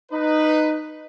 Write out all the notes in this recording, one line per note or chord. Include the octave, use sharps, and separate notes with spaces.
D#4 B4